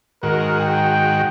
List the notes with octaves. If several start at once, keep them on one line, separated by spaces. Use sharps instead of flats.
G#2 D#3 F#4 A#4
G5